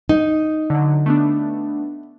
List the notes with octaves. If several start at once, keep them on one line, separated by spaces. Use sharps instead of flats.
D#4
D3 F#3
A3 B3 D4